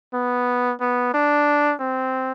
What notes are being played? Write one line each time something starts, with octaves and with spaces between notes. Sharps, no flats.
B3
B3
D4
C4